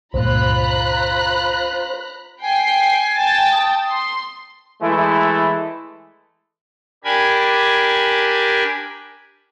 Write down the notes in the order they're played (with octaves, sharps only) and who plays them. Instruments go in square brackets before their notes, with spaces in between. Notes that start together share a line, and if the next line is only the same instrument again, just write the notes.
[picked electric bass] C#2 G2 A#2 [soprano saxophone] F4 [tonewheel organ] C5 [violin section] A#5 B5 F#6
[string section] G5 C7 [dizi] G#5
[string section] G5 A5 A6
[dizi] D#6
[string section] C6
[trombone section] E3 G#3 A3 E4
[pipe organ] D4 G4 A#4 G#5 B5 G#6